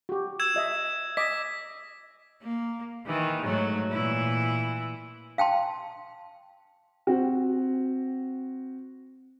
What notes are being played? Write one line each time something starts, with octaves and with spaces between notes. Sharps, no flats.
F#4 G4
E6 G#6 E7
F4 D#5 E5
D#5 D6 B6
A#3
D#3 E3
G#2 F#3 A3
A#2 E3 E4
F5 G5 A5 C6
C4 F#4